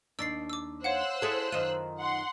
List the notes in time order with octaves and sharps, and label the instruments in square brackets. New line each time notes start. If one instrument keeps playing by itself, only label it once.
[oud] D#2 D4 [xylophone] E6 A6 C7
[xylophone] D6 E6
[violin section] C5 E6 F#6 [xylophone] C#5 F5 F#5
[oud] E4 G#4 A4
[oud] F#2 D#3 F4 [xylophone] D#7
[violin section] F#5 C6